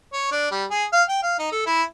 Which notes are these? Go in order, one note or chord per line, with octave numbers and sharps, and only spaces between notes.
C#5
D4
G3
G#4
F5
G5
F5
D#4
A4
E4